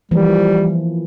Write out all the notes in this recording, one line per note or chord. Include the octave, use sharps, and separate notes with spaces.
E3 F3 G3 A#3